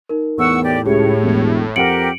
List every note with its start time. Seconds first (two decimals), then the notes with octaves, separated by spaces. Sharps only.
0.09 D#4 A#4
0.38 E2 A2 F#5 C#6 E6
0.64 G4 D5
0.86 C#2 G4 G#4 C#5
1.23 E1
1.76 F2 G4 A#4 F#5 C#7 D7 F#7